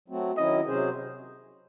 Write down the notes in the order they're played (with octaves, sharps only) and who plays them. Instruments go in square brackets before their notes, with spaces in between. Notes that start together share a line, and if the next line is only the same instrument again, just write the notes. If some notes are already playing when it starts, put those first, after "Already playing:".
[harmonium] F#3 A3 C4 F#4
[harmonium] D#3 F#3 C#4 E4 [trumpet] D#5
[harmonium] C3 F#3 C#4 G#4 C5